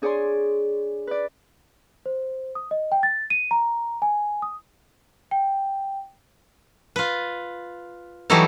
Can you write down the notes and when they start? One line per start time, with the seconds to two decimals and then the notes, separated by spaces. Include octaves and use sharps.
0.02 D4 G#4 C#5 D5 G#5 C6
1.07 B4 D5
2.06 C5
2.55 D#6
2.71 D#5
2.92 G5
3.03 A6
3.30 D#7
3.51 A#5
4.02 G#5
4.42 D#6
5.31 G5
6.96 F4 B4
8.30 E3 F#3 G3 A3 D#4 E4